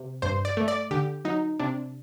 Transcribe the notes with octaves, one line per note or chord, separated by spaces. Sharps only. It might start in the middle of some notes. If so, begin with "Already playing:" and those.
Already playing: C3
G2 C5
D5
A3
D5
D3 G4
F#3 D#4
C3 D4